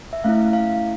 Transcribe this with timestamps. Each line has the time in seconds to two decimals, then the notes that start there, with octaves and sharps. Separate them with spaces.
0.13 E5
0.24 A3 C#4 E4 F5
0.53 F5